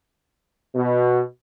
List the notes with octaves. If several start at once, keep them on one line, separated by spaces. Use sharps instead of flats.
B2